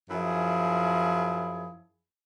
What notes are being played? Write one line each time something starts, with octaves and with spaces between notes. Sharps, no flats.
F#2 F3 E4 G#4